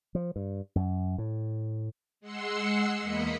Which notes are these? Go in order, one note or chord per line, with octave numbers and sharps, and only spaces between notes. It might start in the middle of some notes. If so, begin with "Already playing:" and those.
F3
G2
F#2
A2
G#3 F#5 C6 E6 C7 C#7
E2 A#3 D#5 B5 B6 C#7